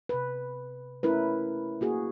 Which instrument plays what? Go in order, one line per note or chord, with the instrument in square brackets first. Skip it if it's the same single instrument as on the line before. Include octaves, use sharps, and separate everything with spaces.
[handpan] C3 B4
A3 C#4 E4 A#4 B4
A#3 F#4 G#4